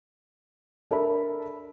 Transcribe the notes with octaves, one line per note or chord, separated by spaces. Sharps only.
D4 A4 A#4 E5 B5